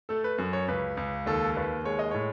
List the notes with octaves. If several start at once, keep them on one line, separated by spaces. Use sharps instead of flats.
A3 A4
B4
F#2
C#5
C#2 B4
C#2
D#2 A4
D#2 B4
G#3 C#5
D#5
A2 C#5